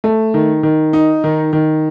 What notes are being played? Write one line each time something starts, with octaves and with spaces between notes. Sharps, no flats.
A3
D#3
D#3
D#4
D#3
D#3